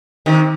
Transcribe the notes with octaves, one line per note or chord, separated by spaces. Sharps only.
C3 D#3